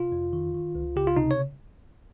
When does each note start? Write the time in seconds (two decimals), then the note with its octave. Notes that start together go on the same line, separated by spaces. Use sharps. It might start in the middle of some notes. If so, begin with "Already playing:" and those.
Already playing: C3 F4
0.12 F2
0.33 D#3
0.54 D#3
0.75 C#2
0.96 C#3 G4
1.07 F4
1.17 C3 D#4
1.31 C#5